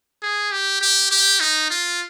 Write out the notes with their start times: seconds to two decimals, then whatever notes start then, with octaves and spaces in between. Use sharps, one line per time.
0.22 G#4
0.52 G4
0.81 G4
1.11 G4
1.40 D#4
1.70 F4